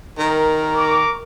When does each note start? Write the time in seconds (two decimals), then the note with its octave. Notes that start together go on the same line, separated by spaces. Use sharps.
0.19 D#3 A#4
0.76 A#5 C#6 D6